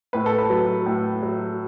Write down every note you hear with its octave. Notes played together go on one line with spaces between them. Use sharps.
A2 B4
A4
B4
F#3
A2
F#3